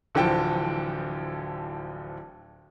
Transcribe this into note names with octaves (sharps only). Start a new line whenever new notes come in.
D1 D3 E3 F3 G5 A5